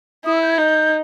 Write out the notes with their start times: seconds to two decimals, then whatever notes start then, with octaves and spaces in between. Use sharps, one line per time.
0.25 E4 D#6
0.33 E6
0.41 G6
0.49 G#6
0.57 D#4 G6